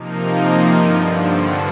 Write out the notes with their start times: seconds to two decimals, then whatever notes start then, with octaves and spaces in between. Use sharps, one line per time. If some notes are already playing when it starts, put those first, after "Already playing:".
Already playing: C3 F3 A#3 D#4
0.77 G2 D3 F3